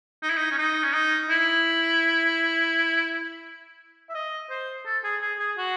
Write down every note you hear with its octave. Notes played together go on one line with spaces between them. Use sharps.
D#4
E4
D#4
C#4
D#4
C#4
D#4
E4
E5
D#5
C5
A4
G#4
G#4
G#4
F#4